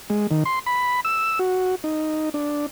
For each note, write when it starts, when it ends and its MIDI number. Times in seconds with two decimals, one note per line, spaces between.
0.10 0.27 56
0.31 0.44 51
0.46 0.59 84
0.66 1.00 83
1.05 1.39 88
1.39 1.75 66
1.84 2.29 63
2.34 2.66 62